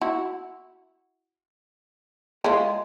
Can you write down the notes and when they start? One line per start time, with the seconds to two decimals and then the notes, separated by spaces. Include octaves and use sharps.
0.01 E4 F#4
2.44 G#3 E4 F4